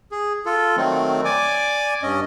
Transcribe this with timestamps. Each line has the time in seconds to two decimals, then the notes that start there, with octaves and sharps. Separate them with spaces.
0.12 G#4
0.46 F4 A4
0.77 D#3 F#3 A3 C4
1.25 D5 G#5 D6
2.03 G2 C#4 D#5